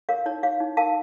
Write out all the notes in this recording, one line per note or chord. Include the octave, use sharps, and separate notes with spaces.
A#4 C#5 F5
D#4 C#5
C#5 F5
D#4
A#4 F5 A5